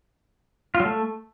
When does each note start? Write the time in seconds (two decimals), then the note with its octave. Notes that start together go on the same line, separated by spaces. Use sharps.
0.75 F4
0.80 F#3
0.85 A3